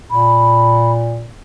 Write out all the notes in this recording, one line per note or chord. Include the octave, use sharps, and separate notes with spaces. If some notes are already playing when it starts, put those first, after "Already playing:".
A#2 B5